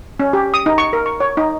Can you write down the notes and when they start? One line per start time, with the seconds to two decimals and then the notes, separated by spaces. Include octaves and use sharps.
0.20 C#4
0.33 G4
0.54 D#6
0.66 D#4
0.78 C#6
0.93 A#4
1.06 C#6
1.20 C#5
1.37 D#4